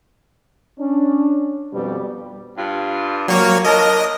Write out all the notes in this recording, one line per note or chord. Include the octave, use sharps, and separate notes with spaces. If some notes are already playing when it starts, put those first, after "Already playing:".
C#4 D4
F2 B2 G3 G4 B4 D5
G2 G3 F4
F#3 A#3 C#5
D4 F4 A#4 D#5